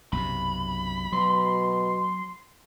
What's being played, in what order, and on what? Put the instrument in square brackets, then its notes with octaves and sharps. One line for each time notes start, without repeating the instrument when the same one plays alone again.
[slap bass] B1 F#2 C3 [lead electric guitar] B5
[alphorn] B2 [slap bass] F#3 [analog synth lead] C6